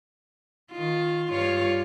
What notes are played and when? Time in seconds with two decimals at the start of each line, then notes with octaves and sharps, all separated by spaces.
0.72 D#3 F4
1.31 G2 F4 C#5